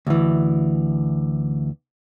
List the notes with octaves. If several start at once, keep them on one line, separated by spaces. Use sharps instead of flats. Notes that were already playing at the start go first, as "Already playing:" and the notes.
D2 E3